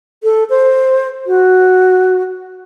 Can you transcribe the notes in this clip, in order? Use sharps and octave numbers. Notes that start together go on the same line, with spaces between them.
A4
C5
F#4